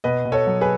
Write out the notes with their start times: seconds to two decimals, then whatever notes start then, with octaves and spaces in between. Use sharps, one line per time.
0.04 B2 B4 D#5
0.25 B2
0.32 A4 C#5
0.47 F#3
0.61 G#4 B4